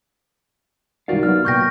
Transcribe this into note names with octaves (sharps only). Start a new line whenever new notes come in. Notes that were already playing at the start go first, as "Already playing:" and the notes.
C2 D#3 F#4 A#4 D5 F5
F#3 B3 F6
C2 A#2 G5 C#6 G6 A#6